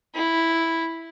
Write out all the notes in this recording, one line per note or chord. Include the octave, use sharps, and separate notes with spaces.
E4